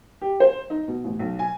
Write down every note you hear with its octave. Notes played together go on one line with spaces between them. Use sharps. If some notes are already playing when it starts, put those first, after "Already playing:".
G4
C5
D#4
B2
A1
B1
G#5